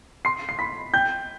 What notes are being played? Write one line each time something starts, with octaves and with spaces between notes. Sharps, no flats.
C6 C7
C7
B5 B6
G5 G6